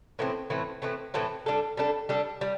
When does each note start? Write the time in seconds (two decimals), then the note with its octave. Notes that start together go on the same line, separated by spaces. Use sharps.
0.19 A2 E3 A3 C4
0.50 A2 E3 A3 C4
0.82 A2 E3 A3 C4
1.14 A2 E3 A3 C4
1.46 G3 D4 A4
1.77 G3 D4 A4
2.09 G3 D4 A4
2.41 G3